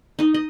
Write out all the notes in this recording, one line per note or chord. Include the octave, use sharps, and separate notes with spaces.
D#4 D#5
D#5